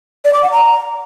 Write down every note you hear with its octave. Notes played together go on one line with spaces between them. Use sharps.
D5
D6
F#5
A#5